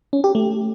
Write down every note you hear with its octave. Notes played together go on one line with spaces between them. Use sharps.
C#4
G4
A3